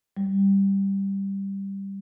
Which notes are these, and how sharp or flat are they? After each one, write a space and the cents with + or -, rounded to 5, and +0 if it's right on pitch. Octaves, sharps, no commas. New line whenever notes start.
G3 +5